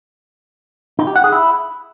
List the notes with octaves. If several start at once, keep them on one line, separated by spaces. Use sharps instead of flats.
D#4
G4
F#5
G#4
E4